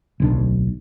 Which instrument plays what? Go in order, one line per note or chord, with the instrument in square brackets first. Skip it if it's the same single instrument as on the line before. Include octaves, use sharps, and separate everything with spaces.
[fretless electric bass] D1 B1 D4